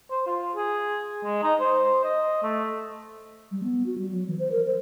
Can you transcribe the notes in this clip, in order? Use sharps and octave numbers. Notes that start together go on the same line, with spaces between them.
C5
F4
G#4
G#3
D#4
C5
D#5
A3
G3
B3
F#4
G3
F#3
E3
C5
A#4
C5